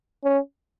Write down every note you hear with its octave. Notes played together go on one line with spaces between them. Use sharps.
C#4